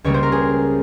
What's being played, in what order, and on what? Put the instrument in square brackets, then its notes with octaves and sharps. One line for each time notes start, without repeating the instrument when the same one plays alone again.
[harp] C#2 C#3 G3 A#3 C#5
C5
A#4
G#4